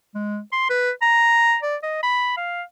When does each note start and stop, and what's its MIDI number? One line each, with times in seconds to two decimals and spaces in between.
0.15 0.40 56
0.52 0.66 84
0.70 0.91 71
1.02 1.57 82
1.63 1.76 74
1.83 2.03 75
2.03 2.35 83
2.37 2.62 77